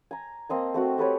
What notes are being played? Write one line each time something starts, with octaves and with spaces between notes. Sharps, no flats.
G#5 A#5
A#3 C4 D#5 A5
A3 C4 F#4
G4 A4 B4 C#5